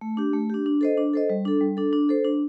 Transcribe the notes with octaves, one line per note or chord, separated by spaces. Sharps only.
A3
D4 G4
A3
D4 G4
D4
A4 C5 D#5
D4
A4 C5 D#5
G3
D4 A4
G3
D4 A4
D4
A4 C5
D4